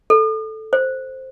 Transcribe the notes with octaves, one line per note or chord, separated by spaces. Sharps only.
A4
C5